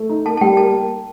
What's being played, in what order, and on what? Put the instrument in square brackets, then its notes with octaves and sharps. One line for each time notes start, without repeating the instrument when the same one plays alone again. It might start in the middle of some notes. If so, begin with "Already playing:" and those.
Already playing: [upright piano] A3
D#4
[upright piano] A#3 [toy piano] A5
[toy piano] A5
[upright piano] G3 [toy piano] G5
[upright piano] A#3 [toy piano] A5